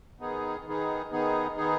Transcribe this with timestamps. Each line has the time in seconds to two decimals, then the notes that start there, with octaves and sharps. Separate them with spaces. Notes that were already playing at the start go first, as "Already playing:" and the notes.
0.20 D#3 B3 D#4 G#4
0.66 D#3 B3 D#4 G#4
1.12 D#3 B3 D#4 G#4
1.57 D#3 B3 D#4 G#4